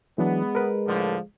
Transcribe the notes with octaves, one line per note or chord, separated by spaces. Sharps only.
E3 F#3 G#3 B3 D4
A#4 B4
A2 D3 F3